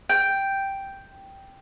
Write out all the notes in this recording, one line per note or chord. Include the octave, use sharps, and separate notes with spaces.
G5